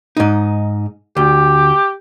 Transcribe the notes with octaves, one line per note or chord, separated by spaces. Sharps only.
G#2 D#4
D2 G4